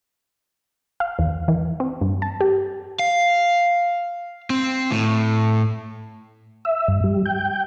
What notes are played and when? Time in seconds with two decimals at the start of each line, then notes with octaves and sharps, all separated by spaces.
1.00 F5
1.19 E2
1.48 E3
1.80 C4
2.01 G2
2.22 A5
2.41 G4
2.99 F5
4.50 C4
4.91 A2
6.65 E5
6.88 G2
7.04 G3
7.26 G5